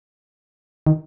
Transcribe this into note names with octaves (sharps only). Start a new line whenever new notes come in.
D#3